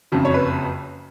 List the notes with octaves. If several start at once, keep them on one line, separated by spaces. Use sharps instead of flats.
F#1 F2 C#3 F#3
C#5
B4